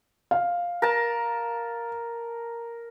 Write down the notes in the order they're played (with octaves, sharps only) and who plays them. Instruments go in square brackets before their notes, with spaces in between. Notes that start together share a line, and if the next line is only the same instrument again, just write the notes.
[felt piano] F5
[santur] A#4 A5